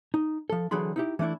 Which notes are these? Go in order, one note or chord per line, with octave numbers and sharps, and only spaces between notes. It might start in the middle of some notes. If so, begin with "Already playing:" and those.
D#4
F3 A4
D3 E3 F#3 G#4 B5 C6
D#4 E4 G4
E3 A3 D4 E4